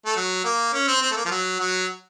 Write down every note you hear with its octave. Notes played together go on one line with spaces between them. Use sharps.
A3
F#3
A#3
C#4
C4
C4
A3
A#3
F3
F#3
F#3